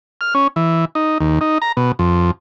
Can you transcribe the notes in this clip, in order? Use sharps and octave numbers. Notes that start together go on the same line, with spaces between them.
F6
C#4
E3
D#4
D#2
D#4
A#5
B2
F2